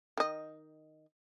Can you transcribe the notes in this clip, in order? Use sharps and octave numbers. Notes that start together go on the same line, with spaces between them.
D#3 D#5